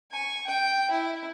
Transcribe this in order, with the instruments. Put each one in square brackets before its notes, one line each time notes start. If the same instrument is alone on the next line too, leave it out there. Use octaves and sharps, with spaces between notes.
[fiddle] G#5 C#6
G5
E4